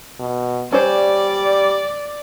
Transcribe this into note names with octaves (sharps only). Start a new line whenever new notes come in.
B2
G3 C#4 C5 D5